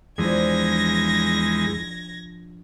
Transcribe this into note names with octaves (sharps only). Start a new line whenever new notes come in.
E2 F3 G#3 D4 G#6 A#6